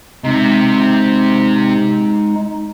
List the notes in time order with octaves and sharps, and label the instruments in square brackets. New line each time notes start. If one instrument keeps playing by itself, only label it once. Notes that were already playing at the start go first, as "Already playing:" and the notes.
[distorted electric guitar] C3 [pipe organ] G#3 D#4